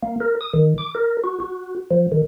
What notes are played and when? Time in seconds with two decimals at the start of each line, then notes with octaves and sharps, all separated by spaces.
0.03 A#3
0.20 A#4
0.41 D#6
0.54 D#3
0.78 D6
0.95 A#4
1.24 F#4
1.40 F#4
1.91 F3
2.12 D#3